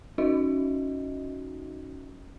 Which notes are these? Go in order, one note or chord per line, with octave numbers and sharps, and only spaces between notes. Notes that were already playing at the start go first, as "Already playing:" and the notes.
C#4 D#4 F#4 D#5 E5